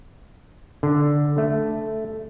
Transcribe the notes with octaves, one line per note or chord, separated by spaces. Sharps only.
D3
A3